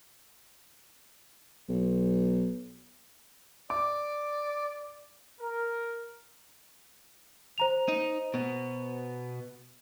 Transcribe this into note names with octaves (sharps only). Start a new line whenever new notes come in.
B1
D5 D6
A#4
C5 A#5 F7
D#4
B2 B3